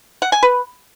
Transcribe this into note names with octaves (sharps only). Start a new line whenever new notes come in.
F#5
G#5
B4